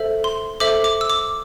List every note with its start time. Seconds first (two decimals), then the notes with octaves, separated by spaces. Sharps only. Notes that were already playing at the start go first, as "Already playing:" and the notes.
Already playing: A4 C5 E5
0.24 C6
0.60 A4 C5 E5 D6
0.84 D6
1.01 E6
1.10 D6